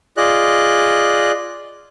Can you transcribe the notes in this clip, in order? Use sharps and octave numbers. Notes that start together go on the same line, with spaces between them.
F4 G#4 D5 D#5 F#6